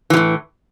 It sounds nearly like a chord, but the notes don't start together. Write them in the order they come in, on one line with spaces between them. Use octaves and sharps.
E3 C3 A2